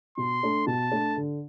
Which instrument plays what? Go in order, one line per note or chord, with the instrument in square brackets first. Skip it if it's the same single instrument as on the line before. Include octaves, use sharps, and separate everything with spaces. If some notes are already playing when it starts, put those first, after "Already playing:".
[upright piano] B2 [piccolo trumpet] C6
[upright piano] A3 D4 A4
[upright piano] B2 [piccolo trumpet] A5
[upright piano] A3 D4 A4
D3